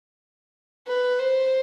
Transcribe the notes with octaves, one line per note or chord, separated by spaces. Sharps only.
B4
C5